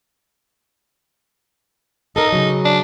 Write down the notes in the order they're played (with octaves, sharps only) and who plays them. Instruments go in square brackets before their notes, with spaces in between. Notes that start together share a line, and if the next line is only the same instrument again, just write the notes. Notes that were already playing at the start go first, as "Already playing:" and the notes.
[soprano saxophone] D#4 [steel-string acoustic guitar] A4 A#4
[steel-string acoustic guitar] C#3 F#3
[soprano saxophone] D4